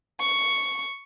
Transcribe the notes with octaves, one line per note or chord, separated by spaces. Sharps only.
C#6